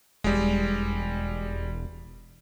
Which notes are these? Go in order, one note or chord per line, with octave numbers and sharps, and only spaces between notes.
E1 G3 G#3